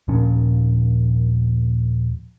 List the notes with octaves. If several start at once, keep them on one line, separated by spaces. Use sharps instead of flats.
D#2 A#2 F3 C#4